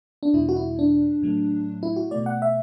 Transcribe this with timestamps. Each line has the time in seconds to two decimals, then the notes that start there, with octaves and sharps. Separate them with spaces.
0.23 D4
0.33 E2 B2 G3 E4
0.49 F#4
0.56 E4
0.79 D4
1.22 A2 F#3 A3
1.83 E4
1.96 F#4
2.11 B2 A3 D5
2.26 F#5
2.42 E5